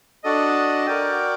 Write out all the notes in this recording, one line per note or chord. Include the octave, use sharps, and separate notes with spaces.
D4 F#4 A4 D#5
F#4 A#4 D5 G5